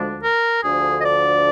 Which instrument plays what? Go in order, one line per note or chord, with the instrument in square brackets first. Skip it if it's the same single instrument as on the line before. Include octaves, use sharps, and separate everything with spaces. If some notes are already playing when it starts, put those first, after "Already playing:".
Already playing: [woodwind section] D2 D3 F3 G#3 D4
A#4
D2 D3 F3 G#4
D#5
D5